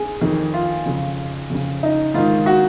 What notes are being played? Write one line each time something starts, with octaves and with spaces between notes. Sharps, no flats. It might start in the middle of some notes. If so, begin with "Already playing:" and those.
Already playing: G#4
F2 D#3
F4
F2 C#3
F2 C#3
D#4
G#2 D#3 F4
F#4